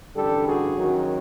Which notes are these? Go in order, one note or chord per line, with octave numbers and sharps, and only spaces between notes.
A1 G2 D3 G3 G4 A4
F#4 G#4
F#2 D#3 F#3